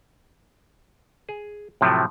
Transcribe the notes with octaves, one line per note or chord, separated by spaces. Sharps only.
G#4
A2 C3 F3 F#3 A3